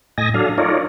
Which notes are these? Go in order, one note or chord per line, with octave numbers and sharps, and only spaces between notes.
A2 D#5 G#5 A#6
F#3 D4 A4 F5
D#4 F4 A#4 C#5 D5